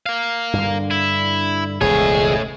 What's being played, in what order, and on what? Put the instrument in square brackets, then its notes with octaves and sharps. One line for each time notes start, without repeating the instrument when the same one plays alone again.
[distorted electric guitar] A#4 F5
[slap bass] G2 D3
[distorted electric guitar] E4
[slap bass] E1 C#2 F3 [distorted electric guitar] A3 C#5 [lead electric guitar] G#4